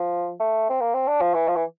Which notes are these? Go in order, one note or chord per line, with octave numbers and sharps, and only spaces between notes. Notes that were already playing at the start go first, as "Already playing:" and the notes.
Already playing: F3
A3
C4
A#3
C4
D4
F3
E3
F3
E3